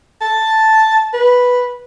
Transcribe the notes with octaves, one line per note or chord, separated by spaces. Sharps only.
A5
B4